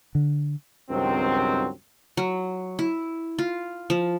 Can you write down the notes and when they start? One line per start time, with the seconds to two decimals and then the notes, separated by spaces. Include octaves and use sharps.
0.15 D3
0.90 C#2 G2 D#3 F#3 C4
2.17 F#3
2.79 E4
3.38 F4
3.90 F3